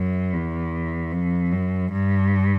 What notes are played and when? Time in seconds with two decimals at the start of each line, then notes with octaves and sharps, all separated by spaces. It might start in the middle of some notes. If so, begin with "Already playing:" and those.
Already playing: F#2
0.33 E2
1.12 F2
1.52 F#2
1.92 G2